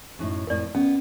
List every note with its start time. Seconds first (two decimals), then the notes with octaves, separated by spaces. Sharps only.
0.19 F#2 A2 D#4
0.47 F2 A2 A#4 D5
0.75 B3 C#4